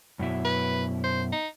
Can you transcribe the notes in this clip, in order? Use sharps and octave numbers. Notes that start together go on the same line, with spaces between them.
F#2 B2 E4
B4
C5
D#4